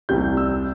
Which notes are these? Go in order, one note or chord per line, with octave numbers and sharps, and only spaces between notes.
C2 C3 G3 G6
E6